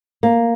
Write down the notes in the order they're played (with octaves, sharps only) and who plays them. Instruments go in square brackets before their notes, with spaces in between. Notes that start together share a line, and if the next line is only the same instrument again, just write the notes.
[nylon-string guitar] A#3